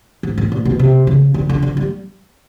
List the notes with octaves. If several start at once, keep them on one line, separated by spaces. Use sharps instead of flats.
G#2
A2
A#2
B2
C3
C#3
D3
D3
D3
G3